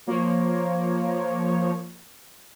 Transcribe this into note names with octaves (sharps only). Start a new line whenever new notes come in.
F3 A#3 C#5